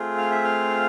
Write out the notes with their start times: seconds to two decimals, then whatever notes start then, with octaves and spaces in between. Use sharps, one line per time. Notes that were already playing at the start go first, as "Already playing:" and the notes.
Already playing: A3 C4 F4 G#4
0.18 F5
0.31 E5
0.44 F5